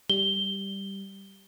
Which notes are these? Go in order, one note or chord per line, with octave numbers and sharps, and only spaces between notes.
G3 G7